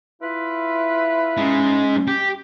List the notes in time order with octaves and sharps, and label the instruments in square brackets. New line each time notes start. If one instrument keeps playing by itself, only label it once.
[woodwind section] E4 F4 B4
[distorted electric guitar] G#3 D#4 [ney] C#4
[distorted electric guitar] G4